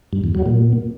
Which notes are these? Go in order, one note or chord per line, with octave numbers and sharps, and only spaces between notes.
G2
E2
F#3
A#2